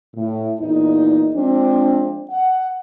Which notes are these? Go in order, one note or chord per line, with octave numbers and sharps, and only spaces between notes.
A2
E2 A#2 D#4
F3 G#3 C4 D4
F#5